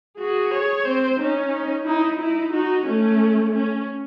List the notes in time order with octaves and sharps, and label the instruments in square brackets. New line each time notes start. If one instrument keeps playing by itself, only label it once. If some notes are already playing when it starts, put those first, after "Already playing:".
[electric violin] F#4 [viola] G#4
[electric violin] C#5
[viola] C4 [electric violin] C5
[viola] C#4 [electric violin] D#4
[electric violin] D#4
[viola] D#4 [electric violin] E4
[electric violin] D#4 [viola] E4
[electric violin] D#4 [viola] F#4
[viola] A3 [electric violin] C#4
[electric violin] C#4